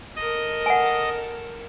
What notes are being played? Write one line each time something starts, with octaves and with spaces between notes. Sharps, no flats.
A4 A#4 D#5
F#5 G#5